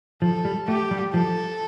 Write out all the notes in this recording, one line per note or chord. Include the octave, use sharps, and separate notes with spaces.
F3 A4
G3
A3 G4
G3
F3 A4